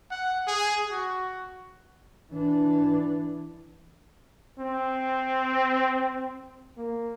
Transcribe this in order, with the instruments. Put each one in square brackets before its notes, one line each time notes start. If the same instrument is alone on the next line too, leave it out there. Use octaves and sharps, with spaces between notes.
[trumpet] F#5
G#4
F#4
[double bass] E3 D4
[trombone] C4
A#3